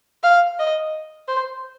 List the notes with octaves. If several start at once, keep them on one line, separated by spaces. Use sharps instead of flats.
F5
D#5
C5